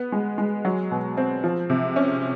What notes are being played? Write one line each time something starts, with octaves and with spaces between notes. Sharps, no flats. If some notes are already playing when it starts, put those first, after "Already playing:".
Already playing: B3
G#3
G#3
F#3
B2
C4
F3
C3
C#4